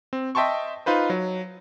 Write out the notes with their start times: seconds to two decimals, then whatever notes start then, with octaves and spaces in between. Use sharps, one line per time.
0.13 C4
0.35 D#5 E5 G5 A5 C6 C#6
0.86 D#4 F4 B4 C5
1.10 F#3